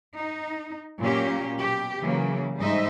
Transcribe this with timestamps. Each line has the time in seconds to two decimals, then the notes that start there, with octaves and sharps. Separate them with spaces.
0.16 D#4
1.00 A#2 F#3 A#3 C#4 G4
1.57 B2 G4
2.00 C#3 E3 F#3 A#3
2.57 G#2 G3 D#4 C5 D#5 E5